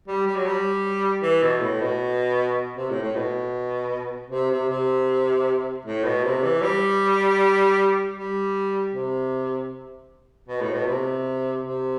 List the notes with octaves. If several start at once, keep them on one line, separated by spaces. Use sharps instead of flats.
G3
G3
F#3
G3
E3
B2
A2
B2
C3
A2
A2
B2
C3
C3
C3
A2
B2
C3
E3
G3
G3
C3
B2
A2
B2
C3
C3